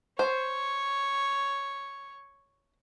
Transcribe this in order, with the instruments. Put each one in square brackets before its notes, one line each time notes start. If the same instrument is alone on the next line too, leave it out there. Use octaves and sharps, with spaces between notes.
[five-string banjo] C5 [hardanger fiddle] C#5